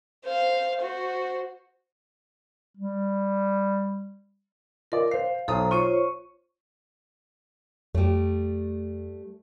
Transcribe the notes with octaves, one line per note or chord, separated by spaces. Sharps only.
C5 F5
F#4 C5
G3
F4 A#4 D5 D#5
C5 F5 C7
B1 A4 C5 A#5 D#6
F4 C5 C#5 C#6 D#7
F2 G3 A3